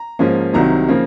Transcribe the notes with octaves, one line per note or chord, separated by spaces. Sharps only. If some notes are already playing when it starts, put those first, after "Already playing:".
Already playing: A#5
G#2 F3 A#3 C#4
C2 C3 D#3 F#3 A#5
C#3 F3 A#3